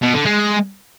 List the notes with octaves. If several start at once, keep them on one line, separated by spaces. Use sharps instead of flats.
B2
D3
G#3